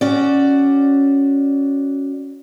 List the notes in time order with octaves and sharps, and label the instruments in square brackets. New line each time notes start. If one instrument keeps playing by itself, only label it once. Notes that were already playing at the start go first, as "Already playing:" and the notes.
[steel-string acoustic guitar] C#4 F#4 D5